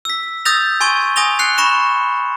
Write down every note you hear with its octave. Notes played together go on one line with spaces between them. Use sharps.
E6 B6
D#6 E6 G6 A6 A#6 F7
G#5 C6 C#6 G#6 D#7 G7
G#5 D#6 A#6 F7 G7
F#6 C7 C#7 F7
B5 C#6 A#6 E7 F7